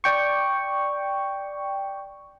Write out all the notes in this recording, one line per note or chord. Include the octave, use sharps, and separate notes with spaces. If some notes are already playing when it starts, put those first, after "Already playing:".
D5 G5 C#6